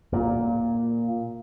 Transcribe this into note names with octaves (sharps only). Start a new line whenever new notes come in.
A#2